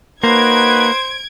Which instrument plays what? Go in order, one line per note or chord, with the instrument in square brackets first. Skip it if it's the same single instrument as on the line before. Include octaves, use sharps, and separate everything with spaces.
[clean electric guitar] A#3 [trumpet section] D#4 F#4 B4 [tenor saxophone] C5 [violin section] G#6 D7